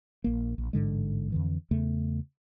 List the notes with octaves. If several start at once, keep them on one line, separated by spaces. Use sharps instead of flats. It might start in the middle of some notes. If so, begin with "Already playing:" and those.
A#1 A#3
A#1
A1 G#2 D3 G#3
F2 D3 E3
E2 C#3 A3